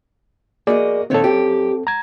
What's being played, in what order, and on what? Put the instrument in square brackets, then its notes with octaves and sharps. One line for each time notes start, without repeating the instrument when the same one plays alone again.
[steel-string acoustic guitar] A#3 F#4 D#5 [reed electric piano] G#4 D5
[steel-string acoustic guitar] A#2 D#3 C#5 [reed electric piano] C4 A4
[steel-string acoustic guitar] F#2 G4
[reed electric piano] A#5 G#6